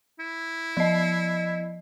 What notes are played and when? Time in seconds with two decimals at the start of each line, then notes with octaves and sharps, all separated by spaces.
0.19 E4
0.77 F3 D#5